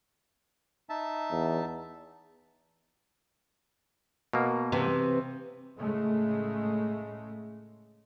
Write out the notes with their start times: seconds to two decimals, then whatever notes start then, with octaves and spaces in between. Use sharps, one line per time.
0.89 D#4 E5 A5
1.31 E2
4.33 B2 A#3
4.72 C3 E3
5.78 A2 C#3 G#3 A3